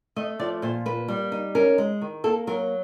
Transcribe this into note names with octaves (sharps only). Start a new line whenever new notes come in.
A3 D#5
F3 D5
A#2 C5
A#3 B4
G3
D#4
C#4 A#4
G#3
D#3
A#3 A4
F#3 A#4